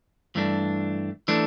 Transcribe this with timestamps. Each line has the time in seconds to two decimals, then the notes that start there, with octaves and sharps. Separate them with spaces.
0.35 G2 E3 A3 D4
1.28 E3 A3 D4